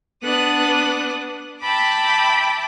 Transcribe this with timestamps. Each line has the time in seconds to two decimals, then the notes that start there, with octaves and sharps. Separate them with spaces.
0.22 B3 D4 D#6 F#6
1.61 E5 G5 A5 B5 D6